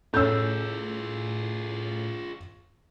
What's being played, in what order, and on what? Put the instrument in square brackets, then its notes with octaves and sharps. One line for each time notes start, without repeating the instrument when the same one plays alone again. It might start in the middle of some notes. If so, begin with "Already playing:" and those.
[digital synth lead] A2 [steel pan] C#4 A4 [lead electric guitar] F4 G#4 [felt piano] E6 G6